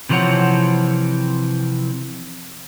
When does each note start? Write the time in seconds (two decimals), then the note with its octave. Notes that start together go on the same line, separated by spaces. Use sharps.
0.09 C3 E3 F3 C4 C#5 F#5